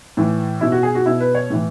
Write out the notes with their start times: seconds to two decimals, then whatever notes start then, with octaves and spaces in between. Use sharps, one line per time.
0.17 A2 E3
0.61 B2 E4
0.72 F#4
0.83 G#4
0.95 F#4
1.06 B2 E4
1.20 B4
1.35 C#5
1.50 A2 E3